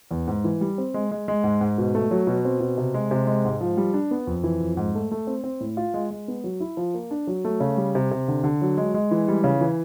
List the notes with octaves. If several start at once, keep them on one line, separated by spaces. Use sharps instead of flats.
E2
G#2
E3
G3
C4
G#3
G#3
G#3
G#2
G#2
B2
A3
F#3
B2
C4
B2
C3
G#3
C3
G#3
G#2
F3
G3
D4
B3
F2
E3
F2
G#2
A3
A3
C4
C4
A2
F4
G#3
G#3
B3
F#3
E4
F3
A#3
D4
F#3
A3
C#3
G3
C3
C3
D3
D3
F#3
G#3
G#3
E3
G3
C#3
E3